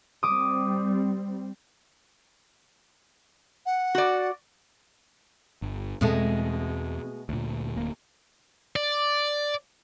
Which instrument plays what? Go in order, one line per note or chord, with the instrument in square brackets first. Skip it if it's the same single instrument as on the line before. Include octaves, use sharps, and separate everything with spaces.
[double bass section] G3 C4 [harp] D6 D#6
[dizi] F#5
[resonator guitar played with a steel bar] F#4 D5
[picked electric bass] G1
[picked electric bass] E2 C4 [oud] B2 G#3 A3
[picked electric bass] D2 A#2
D1 D2 A#3
[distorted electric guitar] D5